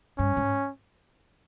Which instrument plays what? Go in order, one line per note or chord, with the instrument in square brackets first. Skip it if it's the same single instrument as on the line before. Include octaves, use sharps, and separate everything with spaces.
[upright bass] G2 [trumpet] C#4
[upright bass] G#2